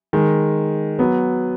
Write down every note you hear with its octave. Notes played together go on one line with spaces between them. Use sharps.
D#3 G#3
F#3 B3